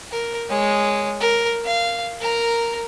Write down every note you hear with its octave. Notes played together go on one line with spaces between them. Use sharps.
A#4
G#3 C#5
A#4
F5
A#4 A#5